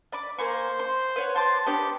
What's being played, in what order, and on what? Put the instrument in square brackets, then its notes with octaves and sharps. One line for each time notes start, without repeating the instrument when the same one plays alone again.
[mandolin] D5 B5 D6
[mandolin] A#3 G#5 C#6 [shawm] C5
[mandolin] C6
B4 C#5 F#5
[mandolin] C5 C6 D6 [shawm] A5
[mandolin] B3 D4 C5 [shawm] G4